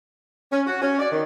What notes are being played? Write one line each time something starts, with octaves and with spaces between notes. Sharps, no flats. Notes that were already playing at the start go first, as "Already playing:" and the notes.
C#4
F#4
C#4
D5
D#3